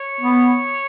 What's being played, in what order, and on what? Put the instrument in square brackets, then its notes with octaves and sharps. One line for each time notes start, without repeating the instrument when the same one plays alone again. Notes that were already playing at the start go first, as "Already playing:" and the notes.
Already playing: [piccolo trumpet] C#5
[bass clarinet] B3